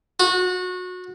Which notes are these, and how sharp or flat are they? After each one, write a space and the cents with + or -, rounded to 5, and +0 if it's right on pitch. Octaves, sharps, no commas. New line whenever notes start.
F#4 -25